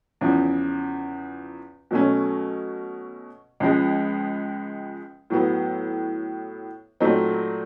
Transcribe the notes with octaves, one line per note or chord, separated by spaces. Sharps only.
E2 C#3 F3
B2 F#3 A3 C#4
C#2 C#3 F3 G#3
A2 F#3 B3
A#2 F#3 A3 C4 D#4